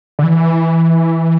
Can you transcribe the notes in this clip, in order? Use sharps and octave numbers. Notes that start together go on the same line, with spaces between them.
D3
E3